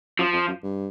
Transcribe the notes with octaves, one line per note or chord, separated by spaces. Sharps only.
F#2 F3
F2
F#2
G2